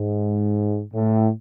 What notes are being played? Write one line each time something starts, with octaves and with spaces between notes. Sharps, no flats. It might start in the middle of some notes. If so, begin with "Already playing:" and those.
Already playing: G#2
A2